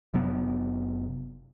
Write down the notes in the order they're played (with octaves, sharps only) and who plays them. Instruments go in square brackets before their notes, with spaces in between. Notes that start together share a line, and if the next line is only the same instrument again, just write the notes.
[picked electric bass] F#1 C3 F#3 B3